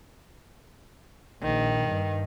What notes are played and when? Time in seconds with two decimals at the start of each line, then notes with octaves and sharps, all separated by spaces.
1.43 A#1 D#3
1.88 G2